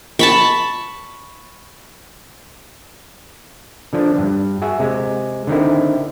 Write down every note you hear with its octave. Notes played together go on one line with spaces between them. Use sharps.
A5 B5 C#6
D3 F3 D4
G2
F#4 G#4 E5
C3 G#3
D3 D#3 C4 E4